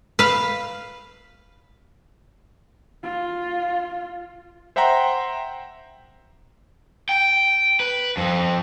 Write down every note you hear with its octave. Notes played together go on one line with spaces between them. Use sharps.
B4 F5
F4
C5 E5 F#5 G5 A#5 C6
G5
B4
F2